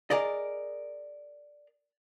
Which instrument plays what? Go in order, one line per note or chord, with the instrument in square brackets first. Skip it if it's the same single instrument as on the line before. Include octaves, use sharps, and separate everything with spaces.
[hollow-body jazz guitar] G#4 A#4 D5 D#5